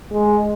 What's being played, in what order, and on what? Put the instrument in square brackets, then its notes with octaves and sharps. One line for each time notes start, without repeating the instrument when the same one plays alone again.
[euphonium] G#3